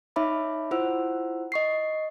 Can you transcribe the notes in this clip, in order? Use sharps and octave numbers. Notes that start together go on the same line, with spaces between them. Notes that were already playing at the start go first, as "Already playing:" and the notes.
D#4 C#5 E5 B5 D6
E4 F4 C5 F#5 E6
D#5 C#6 C7